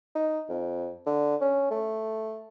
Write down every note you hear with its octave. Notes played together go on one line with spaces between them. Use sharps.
D#4
F2
D3
C#4
A3